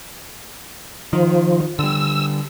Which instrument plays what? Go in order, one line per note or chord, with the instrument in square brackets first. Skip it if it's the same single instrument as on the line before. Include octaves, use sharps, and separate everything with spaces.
[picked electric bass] D#3 [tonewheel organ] F3
[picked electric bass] D3 G3 [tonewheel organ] E6